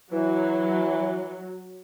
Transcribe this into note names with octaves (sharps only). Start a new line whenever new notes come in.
E3 F#3